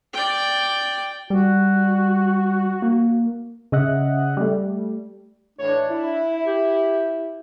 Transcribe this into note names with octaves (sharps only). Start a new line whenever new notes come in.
D5 G5
G3 F#4
A#3
C#3 D#5 E5 F#5
G3 A3
A2 E3 D4 C#5
E4
G4